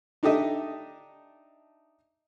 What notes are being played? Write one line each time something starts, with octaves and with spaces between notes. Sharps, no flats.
D4 D#4 G4 A4 D#5 E5